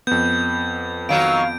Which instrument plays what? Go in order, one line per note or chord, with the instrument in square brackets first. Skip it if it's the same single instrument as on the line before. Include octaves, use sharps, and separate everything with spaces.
[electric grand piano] F2 B3 [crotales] G6
[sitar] D#3 F#3 [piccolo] F5 [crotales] D7